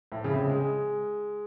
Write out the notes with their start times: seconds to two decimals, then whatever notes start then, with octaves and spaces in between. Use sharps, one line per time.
0.12 A2
0.24 C#3
0.31 C3
0.36 C#3
0.49 G#3